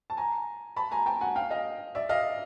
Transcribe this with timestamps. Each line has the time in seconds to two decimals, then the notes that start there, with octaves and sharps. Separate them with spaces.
0.10 A5
0.17 G#5 A#5
0.77 A5 B5
0.91 G#5 A#5
1.06 G5 A5
1.21 F#5 G#5
1.36 F5 G5
1.50 D#5 F5
1.95 D5 E5
2.09 D#5 F5